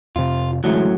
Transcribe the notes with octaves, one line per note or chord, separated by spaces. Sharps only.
F2 C3 F4
F#2 A2 D3 E3 F#3 G#3